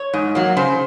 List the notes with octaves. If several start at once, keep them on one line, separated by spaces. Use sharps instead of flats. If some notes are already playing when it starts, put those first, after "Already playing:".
Already playing: C#5
G#2
F#3 A#3
C#3 C5